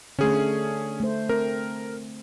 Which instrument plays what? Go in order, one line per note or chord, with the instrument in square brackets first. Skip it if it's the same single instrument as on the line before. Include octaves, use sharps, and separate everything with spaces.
[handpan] D3 A3 [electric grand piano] C#4 G#4
[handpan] A3 C5
[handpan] C4 [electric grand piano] A#4